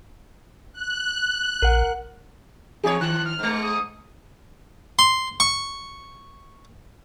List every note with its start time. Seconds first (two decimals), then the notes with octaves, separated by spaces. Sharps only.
0.73 F#6
1.62 A#1 A#4 F#5
2.84 E2 D#4 G#4 C#5
3.01 D#3 F#6
3.26 F6
3.39 G#2 G#3
3.62 D#6
4.99 C6
5.40 C#6